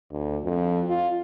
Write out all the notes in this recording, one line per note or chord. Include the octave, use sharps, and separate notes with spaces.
D2
F2
F4